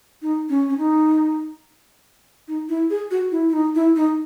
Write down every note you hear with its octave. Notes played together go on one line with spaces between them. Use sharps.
D#4
C#4
C#4
D#4
D#4
E4
G#4
F#4
E4
E4
D#4
E4
D#4